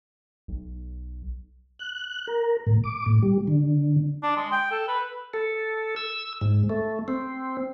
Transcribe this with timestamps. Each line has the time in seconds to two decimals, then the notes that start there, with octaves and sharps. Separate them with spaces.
0.48 B1
1.79 F#6
2.27 A#4
2.67 A2
2.84 D6
3.06 A2
3.22 G3
3.47 D3
4.23 D4
4.36 G#3
4.52 G5
4.72 A4
4.88 B4
5.34 A4
5.96 E6
6.41 G#2
6.70 A3
7.08 C4